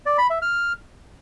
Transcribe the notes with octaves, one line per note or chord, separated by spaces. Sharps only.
D5
B5
E5
F6